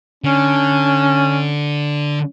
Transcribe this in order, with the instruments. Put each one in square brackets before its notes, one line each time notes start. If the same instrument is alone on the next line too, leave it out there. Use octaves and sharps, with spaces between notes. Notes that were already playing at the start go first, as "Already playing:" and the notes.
[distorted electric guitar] D3 [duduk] C#4